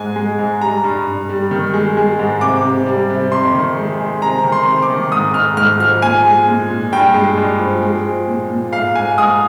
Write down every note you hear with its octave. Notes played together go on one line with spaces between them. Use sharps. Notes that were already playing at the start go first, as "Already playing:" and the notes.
Already playing: G#2 G#3 G#5
G#3
G#2
G3 A#5
G2
G2
G3
D#3
G#3
G#3
G#2
C3 D6
C3
G3
C3
F2 C6
D#3
G#3
G#3
C3 A#5
D#3
C6
C3
D6
D#3
G#2 D#6
G#2 F6
G#2 F6
F3 F6
A#2 G#5
G#3
A#2
A#2
G2 G5
G#3
G2
F3
G#3
F3
A#2
A#2
G#2 F5
G#2 G#5
G#2 D#6